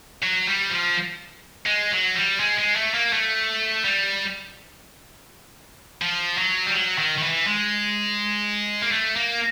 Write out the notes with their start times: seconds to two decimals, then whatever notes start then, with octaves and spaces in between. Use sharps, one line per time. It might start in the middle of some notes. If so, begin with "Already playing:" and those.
0.23 F#3
0.47 G3
0.70 F3
1.67 G#3
1.92 F#3
2.16 G3
2.40 G#3
2.58 G#3
2.75 A3
2.94 A#3
3.13 A3
3.85 G3
6.02 F3
6.38 F#3
6.67 G3
6.74 F#3
6.98 D#3
7.18 D#3
7.23 E3
7.47 G#3
8.82 A#3
8.92 A3
9.16 A#3